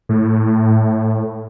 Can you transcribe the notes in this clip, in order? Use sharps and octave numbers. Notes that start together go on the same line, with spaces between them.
A2